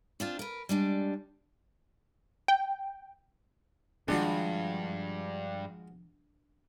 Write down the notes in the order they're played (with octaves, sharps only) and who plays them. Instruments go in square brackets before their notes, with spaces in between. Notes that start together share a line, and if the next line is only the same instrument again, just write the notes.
[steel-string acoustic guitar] C4 D4 F4
A#4 B4
G3 G#3 D4
[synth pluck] G5
[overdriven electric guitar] G2 [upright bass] D#3 F3 [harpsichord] G#3 F4 F#4 [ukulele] D4